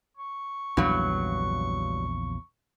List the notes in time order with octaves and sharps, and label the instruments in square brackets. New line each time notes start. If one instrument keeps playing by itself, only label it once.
[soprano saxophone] C#6
[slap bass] A#1 E2 C#3 [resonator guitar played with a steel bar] G2 F#3